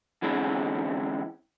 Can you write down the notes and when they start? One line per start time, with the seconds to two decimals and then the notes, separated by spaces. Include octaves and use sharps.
0.22 D3 E3 G#3 C4 C#4